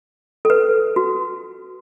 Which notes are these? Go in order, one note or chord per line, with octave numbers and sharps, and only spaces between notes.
A4
B4
F#4